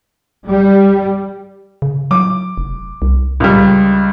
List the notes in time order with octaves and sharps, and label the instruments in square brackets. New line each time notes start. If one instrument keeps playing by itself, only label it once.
[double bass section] G3
[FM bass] C#3
[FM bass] F#3 [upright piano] D6
[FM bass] F1
C2
[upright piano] C#2 G3